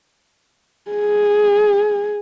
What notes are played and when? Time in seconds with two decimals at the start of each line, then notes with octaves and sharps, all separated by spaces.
0.91 G#4